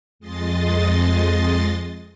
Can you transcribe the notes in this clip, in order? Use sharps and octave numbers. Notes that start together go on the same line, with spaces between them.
F2 G#3 D#5 C6 A6